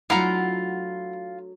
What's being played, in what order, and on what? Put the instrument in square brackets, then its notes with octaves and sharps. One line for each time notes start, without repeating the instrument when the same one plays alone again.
[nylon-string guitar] F#3 A3 D4 [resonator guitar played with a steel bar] E4 F#5 A#5 [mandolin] F4